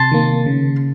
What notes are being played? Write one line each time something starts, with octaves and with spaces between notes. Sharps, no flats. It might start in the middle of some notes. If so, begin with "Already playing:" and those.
Already playing: C3 A5 C6
D#3 A#3
C#3